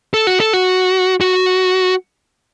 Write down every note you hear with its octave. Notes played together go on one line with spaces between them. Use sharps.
A4
F#4
A4
F#4
F#4